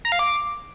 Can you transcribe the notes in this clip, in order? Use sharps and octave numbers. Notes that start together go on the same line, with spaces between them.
A#5
F5
D6